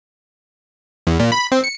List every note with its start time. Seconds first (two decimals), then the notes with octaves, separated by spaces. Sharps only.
1.07 E2
1.20 A#2
1.32 B5
1.52 C4
1.64 C#7